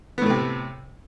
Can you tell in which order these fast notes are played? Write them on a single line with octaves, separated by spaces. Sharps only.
B3 A2 A3 C3